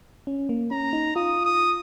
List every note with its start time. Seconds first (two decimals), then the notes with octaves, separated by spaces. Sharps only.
0.27 C#4
0.49 A#3
0.71 C#4 A#5
0.93 D#4
1.16 F4 D#6
1.45 D#6